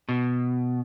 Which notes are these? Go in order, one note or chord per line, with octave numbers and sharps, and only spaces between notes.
B2